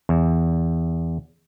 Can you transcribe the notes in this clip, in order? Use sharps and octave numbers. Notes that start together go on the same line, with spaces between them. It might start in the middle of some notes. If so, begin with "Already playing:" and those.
E2